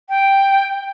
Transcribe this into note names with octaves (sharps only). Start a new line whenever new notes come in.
G5